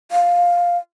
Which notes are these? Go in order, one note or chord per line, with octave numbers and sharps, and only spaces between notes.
F5